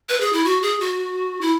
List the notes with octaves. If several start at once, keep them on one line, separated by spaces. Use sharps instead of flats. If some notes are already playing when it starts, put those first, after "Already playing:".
B4
G#4
E4
F#4
G#4
F#4
E4